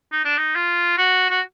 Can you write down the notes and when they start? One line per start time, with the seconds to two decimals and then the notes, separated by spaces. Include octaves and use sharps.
0.12 D#4
0.25 D4
0.37 D#4
0.56 F4
0.98 F#4
1.30 F#4